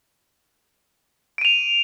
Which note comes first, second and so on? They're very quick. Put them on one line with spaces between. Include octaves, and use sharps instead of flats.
D7 D#7 F7